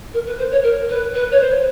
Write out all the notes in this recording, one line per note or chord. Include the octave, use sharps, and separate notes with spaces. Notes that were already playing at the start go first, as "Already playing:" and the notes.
A#4
B4
C5
C#5
A#4
B4
B4
C#5
C5